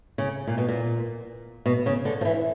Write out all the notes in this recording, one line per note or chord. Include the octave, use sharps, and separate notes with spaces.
C#3
A#2
B2
A#2
B2
C#3
D3
F3
E3